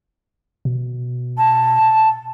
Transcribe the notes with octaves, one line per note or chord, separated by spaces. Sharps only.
B2
A5